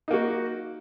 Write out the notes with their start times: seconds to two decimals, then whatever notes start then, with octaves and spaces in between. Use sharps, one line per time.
0.08 D#4
0.11 A#3
0.13 F#4